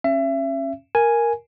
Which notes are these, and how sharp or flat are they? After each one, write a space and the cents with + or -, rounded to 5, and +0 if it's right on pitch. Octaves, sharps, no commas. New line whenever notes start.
C#4 -30 E5 +30
A#4 +0 G#5 +0